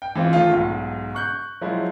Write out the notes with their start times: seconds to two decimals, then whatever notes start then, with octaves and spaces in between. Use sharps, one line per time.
0.02 G5
0.15 E3 G#3 C4 F4
0.33 D#3 A3 F4
0.51 B1 G#2
1.15 C#6 F#6 G6
1.61 F3 F#3 G#3 E4